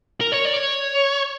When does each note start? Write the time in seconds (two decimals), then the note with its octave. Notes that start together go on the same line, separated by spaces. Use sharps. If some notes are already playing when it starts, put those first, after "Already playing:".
0.21 A#4
0.32 C#5
0.45 D5
0.56 C#5